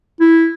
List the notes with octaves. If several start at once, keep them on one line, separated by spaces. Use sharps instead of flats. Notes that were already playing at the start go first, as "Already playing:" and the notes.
E4